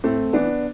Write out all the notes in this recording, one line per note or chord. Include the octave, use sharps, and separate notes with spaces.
A2 A3 C4
E3 B3 D4